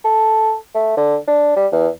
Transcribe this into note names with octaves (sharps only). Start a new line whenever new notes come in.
A4
A3
D3
D4
G3
E2